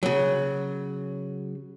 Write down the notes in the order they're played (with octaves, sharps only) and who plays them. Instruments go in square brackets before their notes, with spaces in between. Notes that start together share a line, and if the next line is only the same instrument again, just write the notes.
[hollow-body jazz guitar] C#3 F#3